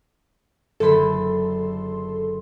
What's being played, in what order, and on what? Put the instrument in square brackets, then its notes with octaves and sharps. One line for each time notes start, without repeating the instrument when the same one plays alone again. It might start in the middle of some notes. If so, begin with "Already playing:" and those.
[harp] F#1 D3 B5 [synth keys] A4 C6